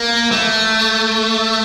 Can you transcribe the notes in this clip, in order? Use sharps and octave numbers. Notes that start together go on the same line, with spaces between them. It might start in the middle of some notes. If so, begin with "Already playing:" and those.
Already playing: A#3
A3